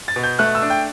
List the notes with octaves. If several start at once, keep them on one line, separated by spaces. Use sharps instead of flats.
A6
B2
G6
A3 F#6
E6
D4
G5